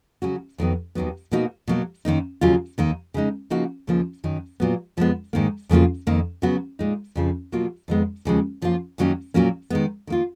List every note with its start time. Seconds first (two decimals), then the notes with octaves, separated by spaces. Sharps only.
0.22 C#3 F#3 C#4 F#4
0.58 F2 D#3 F#3 B3
0.95 D#2 D#3 F#3 B3
1.31 B2 A#3 D#4 F#4
1.68 B2 F#3 A#3
2.05 F#2 D#3 A#3 D#4
2.41 D#2 C#3 F#3 C#4 F4
2.78 D#2 D#3 A#3
3.14 C#3 G#3 D#4
3.50 C#3 F3 A#3 D#4 F#4
3.87 D#2 C#3 F3 A#3
4.24 F#2 D#3 F#3
4.60 A#2 F#3 B3
4.97 F2 F3 G#3 B3
5.33 G#2 D#3 A#3
5.69 F2 C#3 F#3 A#3 F4
6.07 F2 D#3 A#3
6.42 C#3 F#3 B3 F#4
6.79 A#2 G#3 D#4
7.15 F2 C#3 F3
7.52 B2 F#3 A#3 F4
7.88 F2 D#3 G#3 B3
8.25 D#2 C#3 F3 G#3
8.62 F#2 F3 A#3 F4
8.98 F#2 D#3 F#3 A#3 C#4
9.34 A#2 F#3 A#3 C#4
9.70 D#3 G#3 B3
10.07 D#3 A#3 F4